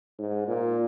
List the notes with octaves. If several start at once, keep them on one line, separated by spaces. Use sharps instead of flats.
G#2
A#2